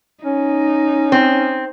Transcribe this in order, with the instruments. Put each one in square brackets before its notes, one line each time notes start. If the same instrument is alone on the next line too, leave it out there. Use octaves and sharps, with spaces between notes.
[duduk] C#4 [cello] D#4
[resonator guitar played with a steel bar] C4